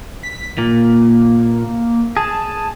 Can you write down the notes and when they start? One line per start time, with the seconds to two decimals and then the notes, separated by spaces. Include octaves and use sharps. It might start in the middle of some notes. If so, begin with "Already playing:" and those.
0.23 B6
0.58 A#2 A#3
2.17 G#4 A5